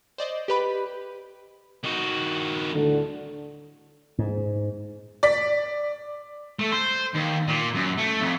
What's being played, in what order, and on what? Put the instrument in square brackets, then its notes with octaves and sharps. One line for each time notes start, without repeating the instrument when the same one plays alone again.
[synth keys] C5 D5 D#5
G4 B4 B5
[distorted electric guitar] D#3 F#4
[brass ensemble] D2 A2 D3
[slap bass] G#2
[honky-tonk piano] D5 B6
[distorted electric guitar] A3
C5
D#2
A#2
F#2
A3
F2